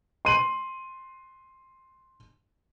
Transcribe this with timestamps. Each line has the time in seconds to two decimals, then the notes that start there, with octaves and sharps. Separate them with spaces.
0.25 C6 D#7 F#7